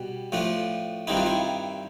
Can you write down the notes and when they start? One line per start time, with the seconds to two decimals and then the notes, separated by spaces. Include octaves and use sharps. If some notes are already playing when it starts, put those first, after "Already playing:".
Already playing: B2 G3
0.32 A2 F3 A3 D4
1.07 G2 D#3 G3 C4 D#4 E4
1.17 F4
1.26 E4